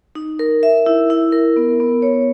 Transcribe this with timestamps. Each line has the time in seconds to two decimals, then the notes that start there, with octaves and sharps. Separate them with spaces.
0.15 D#4
0.39 A#4
0.63 E5
0.86 E4
1.10 E4
1.32 A#4
1.57 B3
1.80 B3
2.02 C#5